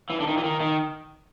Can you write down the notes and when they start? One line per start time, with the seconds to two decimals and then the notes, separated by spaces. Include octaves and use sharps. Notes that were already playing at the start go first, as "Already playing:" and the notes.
0.10 E3
0.20 D3
0.27 D#3
0.37 E3
0.44 D#3
0.60 D#3